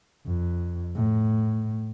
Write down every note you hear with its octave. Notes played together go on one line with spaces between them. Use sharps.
F2
A2